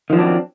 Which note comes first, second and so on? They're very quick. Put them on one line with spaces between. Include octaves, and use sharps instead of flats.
D#3 F3 F#3 D4 C4